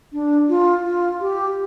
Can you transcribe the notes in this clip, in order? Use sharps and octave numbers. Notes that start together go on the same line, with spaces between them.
D4
F4
F4
G4